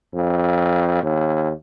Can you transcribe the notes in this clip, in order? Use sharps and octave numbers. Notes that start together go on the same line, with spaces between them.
F2
D#2